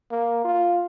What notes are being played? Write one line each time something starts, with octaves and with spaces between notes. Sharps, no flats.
A#3
F4